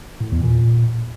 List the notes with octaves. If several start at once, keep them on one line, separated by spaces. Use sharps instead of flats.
A2
E2
A#2